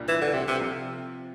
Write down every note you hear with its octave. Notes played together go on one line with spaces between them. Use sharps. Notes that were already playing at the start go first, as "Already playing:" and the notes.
Already playing: C2 A#2 G3 D4 F4
E3
D3
C3
C3
C3 F3 C4 F4